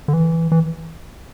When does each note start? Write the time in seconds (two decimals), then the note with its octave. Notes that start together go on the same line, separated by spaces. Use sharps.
0.08 D3
0.13 E3
0.52 E3